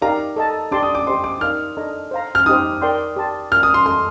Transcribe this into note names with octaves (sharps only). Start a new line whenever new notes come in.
D#4 G4 A#4 D5 F5 A#5
A4 D#5 A5
D4 G4 D5 A5 C6 D6
D#6
D6
G4 C5 D#5 C6
D6
D#4 A#4 D5 F5 F6
D4 A4 D#5 A#5
C5 F5 A#5
F6
D#4 G4 C5 D#6
A#4 D5 G5 C6
G4 D5 A5 C6
F4 A#4 D5 F6
D#6
C6
A4 D#5 A#5 C6